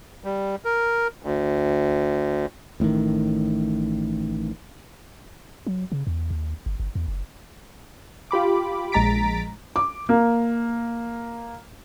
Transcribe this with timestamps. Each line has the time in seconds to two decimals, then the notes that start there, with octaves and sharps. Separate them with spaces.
0.24 G3
0.65 A#4
1.23 D2
2.80 A1 A2 C3 D#3
5.67 F#3
5.92 C#3
6.07 E2
6.31 D#2
6.66 G1
6.80 G1
6.95 E2
7.08 F#1
8.31 F4 G4 B5 D6
8.92 A#1 G#3 A#5 A6 B6 D7
9.76 D6
10.09 A#3